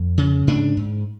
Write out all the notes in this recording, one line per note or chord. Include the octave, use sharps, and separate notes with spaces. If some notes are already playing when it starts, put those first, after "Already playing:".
Already playing: F2
C#3
G#2 D4
G#2